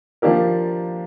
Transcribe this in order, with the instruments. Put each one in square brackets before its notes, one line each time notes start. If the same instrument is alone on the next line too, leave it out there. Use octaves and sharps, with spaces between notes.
[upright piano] F3 A#3 D4 G4 A#4